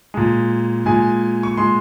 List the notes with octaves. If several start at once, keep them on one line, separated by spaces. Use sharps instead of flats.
A#2 G#3
A#2 G#3 G#5
C#6
A#2 G#3 C6